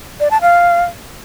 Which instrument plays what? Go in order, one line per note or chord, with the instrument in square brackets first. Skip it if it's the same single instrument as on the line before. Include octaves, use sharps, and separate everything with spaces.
[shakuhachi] D5
A5
F5